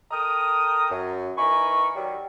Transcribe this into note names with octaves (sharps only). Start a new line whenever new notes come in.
A4 A#4 G5 A#5 D#6
F#2
E3 D#4 A#4 G#5 B5 C#6
D#3 F#3 G3